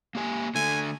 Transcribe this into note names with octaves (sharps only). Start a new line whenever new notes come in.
A#3 G4 G#5
D3 A3 G#5